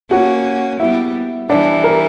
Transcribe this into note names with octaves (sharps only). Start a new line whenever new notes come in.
A#3 C#4 F#4 F#5
G3 B3 E4 E5
E3 G3 D4 D5
A#4 A#5